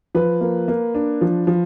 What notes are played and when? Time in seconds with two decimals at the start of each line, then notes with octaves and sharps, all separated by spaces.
0.15 F3 B4
0.41 A#3
0.68 A#3
0.95 D4
1.21 F3
1.47 F3